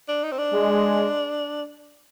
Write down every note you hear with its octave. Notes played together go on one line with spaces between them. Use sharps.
D4
D#4
C4
D4
G#3